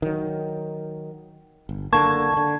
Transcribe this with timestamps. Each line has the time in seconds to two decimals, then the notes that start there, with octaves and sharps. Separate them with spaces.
0.02 D#3 F#3
1.69 G1
1.93 F#1 D3 A#3 A5 C#6 G#6
2.33 D3 D#3